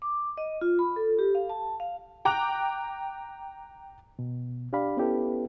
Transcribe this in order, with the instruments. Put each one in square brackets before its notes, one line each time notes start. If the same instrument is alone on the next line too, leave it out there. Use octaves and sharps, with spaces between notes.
[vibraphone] D6
D#5
F4
B5
A4
G4
F5
A5
F5
[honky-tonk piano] G5 A#5 D6 F#6 F7
[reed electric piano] B2
D4 G4 D5 F5 B5
B3 C#4 E4 G4 A4 B4